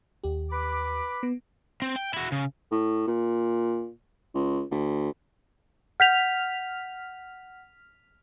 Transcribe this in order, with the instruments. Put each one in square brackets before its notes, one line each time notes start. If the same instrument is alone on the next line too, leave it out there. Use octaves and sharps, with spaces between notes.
[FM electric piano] D#2 G4
[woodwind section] B4 B5 D6
[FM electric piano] B3
[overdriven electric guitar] C4
G5
E4 F#4
C#3
[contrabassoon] A2
A#2
C#2
D2
[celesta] F#5 G6 [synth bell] F6 B6 F7